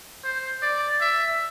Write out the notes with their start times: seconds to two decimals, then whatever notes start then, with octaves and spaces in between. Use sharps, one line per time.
0.24 C5
0.62 D5
1.00 E5